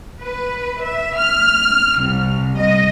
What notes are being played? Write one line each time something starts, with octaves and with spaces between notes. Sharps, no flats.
B4
E5
F6
C2
D#5